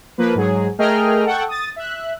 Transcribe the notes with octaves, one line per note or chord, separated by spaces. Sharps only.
F3 A#3 B4
G#2 F#3 G#4
A3 G#4 A#4 D#5 G5 F6
A4 F#5 G5 C#6
D#6 A6
E5 F#6